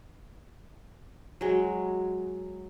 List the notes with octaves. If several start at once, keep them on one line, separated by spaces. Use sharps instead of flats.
F#3 G#3